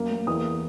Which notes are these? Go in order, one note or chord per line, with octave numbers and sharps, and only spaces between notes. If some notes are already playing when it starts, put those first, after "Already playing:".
Already playing: F#2 A#3
A#3
E2 D#6